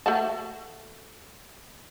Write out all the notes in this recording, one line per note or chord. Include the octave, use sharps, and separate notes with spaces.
A3 F#4 A5